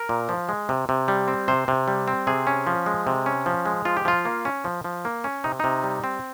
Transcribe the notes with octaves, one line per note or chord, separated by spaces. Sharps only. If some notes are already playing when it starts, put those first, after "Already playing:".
Already playing: A#4
A#2
F3
G#3
C3
C3
G3
C4
C3 C5
C3
G3
C4
C3 G#4
C#4
F3
G#3
C3
C#4
F3
G#3
F3 F4
G4
F3 F4
A#3
C#4
F3
F3
A#3
C#4
C3 D#4
C3 D#4
G3
C4